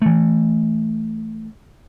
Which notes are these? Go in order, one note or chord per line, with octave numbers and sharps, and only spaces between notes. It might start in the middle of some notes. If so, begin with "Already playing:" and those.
E3 A3